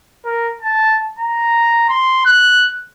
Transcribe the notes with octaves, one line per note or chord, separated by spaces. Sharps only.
A#4
A5
A#5
C6
F#6